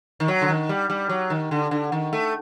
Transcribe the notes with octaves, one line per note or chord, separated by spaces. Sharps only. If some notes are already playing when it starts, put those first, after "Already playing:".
D#3
F#3
D3
D#3
G3
G3
F#3
D#3
D3
D3
D#3
A3